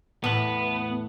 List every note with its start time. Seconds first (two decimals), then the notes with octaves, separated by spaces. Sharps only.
0.24 E2 A2 B3 B4